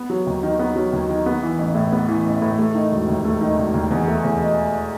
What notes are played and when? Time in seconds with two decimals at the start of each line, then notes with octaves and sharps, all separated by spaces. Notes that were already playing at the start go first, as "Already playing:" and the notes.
Already playing: B3
0.10 F#3
0.26 D#2
0.43 D#3
0.59 B3
0.75 F#3
0.92 D#2
1.09 D#3
1.26 B3
1.43 E3
1.59 A1
1.75 A2
1.92 B3
2.09 E3
2.26 A1
2.42 A2
2.58 A3
2.75 D#3
2.92 E1
3.08 D#2
3.25 A3
3.41 D#3
3.58 E1
3.74 D#2
3.91 E2
4.07 A3
4.24 E2
4.40 B2